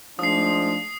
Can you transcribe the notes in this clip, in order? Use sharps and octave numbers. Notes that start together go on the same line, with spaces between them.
F3 G#3 A3 D4 D#4 D#6 C7